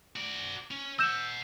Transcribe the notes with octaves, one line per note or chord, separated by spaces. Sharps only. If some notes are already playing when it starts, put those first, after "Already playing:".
F#4 D5
C#4
D#5 F#5 E6 G6 E7